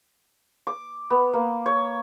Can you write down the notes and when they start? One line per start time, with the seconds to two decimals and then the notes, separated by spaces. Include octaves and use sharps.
0.67 D6
1.10 B3
1.33 A#3
1.66 C#5